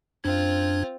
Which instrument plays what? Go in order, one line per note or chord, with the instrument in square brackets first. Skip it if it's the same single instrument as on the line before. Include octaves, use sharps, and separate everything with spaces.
[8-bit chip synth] F#2 D4 G#6 [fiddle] C4 F4